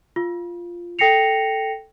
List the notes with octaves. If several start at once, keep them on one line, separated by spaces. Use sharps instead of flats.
F4
A4 G5 A#6 C7 C#7 F7